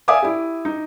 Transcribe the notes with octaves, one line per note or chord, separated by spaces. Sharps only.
D5 E5 F5 G#5 D6 D#6
E4 G4
D#4